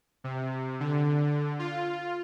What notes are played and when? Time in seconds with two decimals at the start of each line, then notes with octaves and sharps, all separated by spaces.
0.24 C3
0.80 D3
1.59 F4